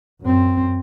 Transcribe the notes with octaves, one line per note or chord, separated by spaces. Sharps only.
F#2 C4